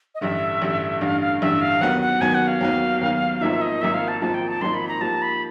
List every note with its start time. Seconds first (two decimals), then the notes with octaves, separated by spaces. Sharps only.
0.15 D#5
0.21 A1 G2 D3 E5
0.62 A1 G2 D3
1.01 A1 G2 D3 F5
1.21 F5
1.41 A1 G2 D3 E5
1.61 F5
1.81 D#2 D#3 F#3 B3 F#5
2.01 F#5
2.21 D#2 D#3 F#3 B3 G#5
2.34 F#5
2.48 F5
2.61 D#2 D#3 F#3 B3
3.01 D#2 D#3 F#3 B3
3.41 G#1 G#2 F3 A#3 D#4 E5
3.62 D#5
3.81 G#1 G#2 F3 A#3 D#4 E5
3.94 F5
4.08 A5
4.22 G#1 G#2 F3 A#3 D#4 A5
4.34 G5
4.48 A5
4.61 G#1 G#2 F3 A#3 D#4 C6
4.74 B5
4.88 A#5
5.01 G#2 F3 A#3 D#4 G4 A5
5.22 B5